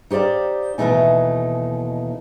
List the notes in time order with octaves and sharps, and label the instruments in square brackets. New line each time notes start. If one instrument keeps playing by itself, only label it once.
[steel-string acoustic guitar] D#4 G4 C5 D5 F5
D#2 B2 E3 A3 D#4 G#5